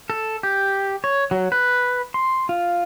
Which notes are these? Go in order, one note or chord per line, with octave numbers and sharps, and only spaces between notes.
A4
G4
C#5
F#3
B4
C6
F4